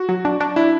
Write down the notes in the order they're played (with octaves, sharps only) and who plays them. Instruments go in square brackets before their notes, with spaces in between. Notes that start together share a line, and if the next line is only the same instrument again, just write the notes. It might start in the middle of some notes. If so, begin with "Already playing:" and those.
Already playing: [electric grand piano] F#4
[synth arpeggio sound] F#3
D4
D4
[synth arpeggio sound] D4 [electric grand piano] E4